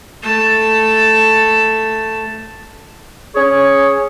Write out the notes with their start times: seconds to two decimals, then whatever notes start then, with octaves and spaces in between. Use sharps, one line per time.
0.23 A3 A5
3.34 C#4 G#4 C#5